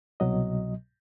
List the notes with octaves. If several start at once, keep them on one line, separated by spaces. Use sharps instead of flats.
C2 B2 F#3 D#5